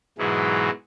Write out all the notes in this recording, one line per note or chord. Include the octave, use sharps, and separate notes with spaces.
G#2 B2 E3 F#3 G#3